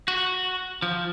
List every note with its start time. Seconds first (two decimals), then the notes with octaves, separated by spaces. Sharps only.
0.08 F#4
0.82 F3